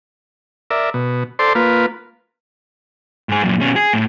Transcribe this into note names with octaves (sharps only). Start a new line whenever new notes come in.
A#4 D5 E5
B2
A4 C5 D5 C6
A#3 F4 B4
G#2 G#4
F#2 A#2
B2 C#4
G#4
A2